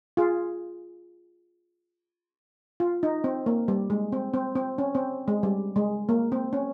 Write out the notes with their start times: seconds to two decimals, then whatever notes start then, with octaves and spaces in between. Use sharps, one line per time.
0.17 F4 G#4
2.80 F4
3.03 D#4
3.24 C4
3.46 A#3
3.68 G3
3.90 G#3
4.12 C4
4.34 C4
4.55 C4
4.78 C#4
4.95 C4
5.28 G#3
5.43 G3
5.76 G#3
6.09 A#3
6.32 C4
6.53 C#4